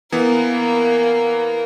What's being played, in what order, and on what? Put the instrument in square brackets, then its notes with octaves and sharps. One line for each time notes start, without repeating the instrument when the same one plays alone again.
[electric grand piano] E3 B3 [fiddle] A#3 A#4